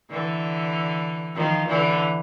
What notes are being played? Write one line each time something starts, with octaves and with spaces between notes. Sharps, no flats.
D3 E3
D#3 F3
D3 E3